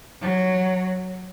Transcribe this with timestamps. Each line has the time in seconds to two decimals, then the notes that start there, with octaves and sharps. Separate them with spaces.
0.22 F#3